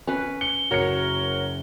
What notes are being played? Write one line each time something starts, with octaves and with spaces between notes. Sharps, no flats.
C#4 B4
C#7 G7
F#1 F#4 A#4 C#5 C#7